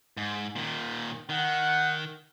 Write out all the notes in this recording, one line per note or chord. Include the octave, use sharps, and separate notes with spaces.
G#2
A#2 D#3
D#3 F#5